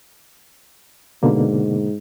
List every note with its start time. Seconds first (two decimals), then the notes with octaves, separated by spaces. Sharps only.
1.23 G#2 B2 D3 A#3